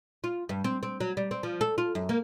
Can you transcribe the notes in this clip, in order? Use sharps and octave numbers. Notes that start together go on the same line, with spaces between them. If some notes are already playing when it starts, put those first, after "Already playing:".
F4
G2
C4
C4
F#3
G3
C4
F3
A4
F4
F#2
A#3